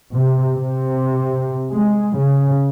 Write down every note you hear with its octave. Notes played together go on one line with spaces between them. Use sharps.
C3
C3
G#3
C#3